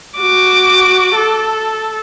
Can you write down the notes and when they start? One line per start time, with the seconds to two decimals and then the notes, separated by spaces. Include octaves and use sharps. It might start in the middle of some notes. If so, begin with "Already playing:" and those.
0.17 F#4 D6
1.16 A4